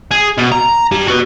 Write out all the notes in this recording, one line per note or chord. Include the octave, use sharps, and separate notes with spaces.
G#4
B2
A#5
G4 A5
F#4 B4